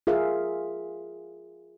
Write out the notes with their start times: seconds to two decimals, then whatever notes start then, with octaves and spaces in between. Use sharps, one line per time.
0.07 F4 G#4 A#4 E5 F5